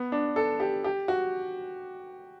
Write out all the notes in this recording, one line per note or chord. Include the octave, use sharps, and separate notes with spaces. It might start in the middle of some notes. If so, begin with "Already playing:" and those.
Already playing: B3
D4
A4
G4
G4
F#4